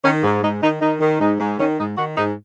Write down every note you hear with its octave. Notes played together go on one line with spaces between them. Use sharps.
D#3 C#4
G#2
G#2 D#4
D#3 D#4
D#3 D#4
D#3
G#2 D#4
G#2
D#3 C#4
G#2 D#4
D#3 F#4
G#2 D#4